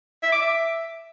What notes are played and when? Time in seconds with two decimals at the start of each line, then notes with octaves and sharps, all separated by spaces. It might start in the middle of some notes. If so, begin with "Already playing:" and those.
0.23 E5
0.32 D6
0.42 E5